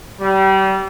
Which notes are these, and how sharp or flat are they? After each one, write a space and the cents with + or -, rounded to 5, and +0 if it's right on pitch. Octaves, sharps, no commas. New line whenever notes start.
G3 -30